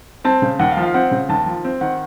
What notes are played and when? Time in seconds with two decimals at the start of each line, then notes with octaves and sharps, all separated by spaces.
0.24 C4 A5
0.42 C#3
0.59 D#2 F#5
0.71 F5
0.77 F3
0.83 F5
0.94 C4 F#5
1.11 C#3
1.29 D#2 A5
1.46 F3
1.64 C4
1.81 D#3 F#5